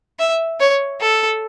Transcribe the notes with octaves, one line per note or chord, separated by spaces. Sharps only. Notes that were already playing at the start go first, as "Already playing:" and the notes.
E5
C#5
A4